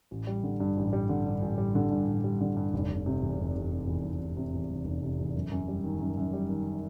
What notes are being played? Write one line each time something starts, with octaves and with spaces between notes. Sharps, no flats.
A1
G3
D3
G2
A1
G3
D3
G2
A1
G3
D3
G2
A1
G3
D3
G2
F1
F1
C3
E2
F1
F1
C3
E2
F1
F1
C3
E2
F1
F1
C3
E2
F#2
F#2
G3
D#3
F#2
F#2
G3
D#3